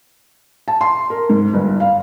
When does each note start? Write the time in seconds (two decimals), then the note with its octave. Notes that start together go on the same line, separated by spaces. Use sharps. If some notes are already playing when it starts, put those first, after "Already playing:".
0.68 A5
0.81 C6
1.10 A#4
1.30 G#2
1.53 G1
1.80 F5